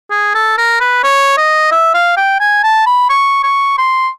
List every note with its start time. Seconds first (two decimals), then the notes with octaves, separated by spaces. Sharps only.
0.11 G#4
0.35 A4
0.58 A#4
0.80 B4
1.03 C#5
1.38 D#5
1.71 E5
1.94 F5
2.17 G5
2.40 G#5
2.63 A5
2.86 B5
3.10 C#6
3.44 C#6
3.78 C6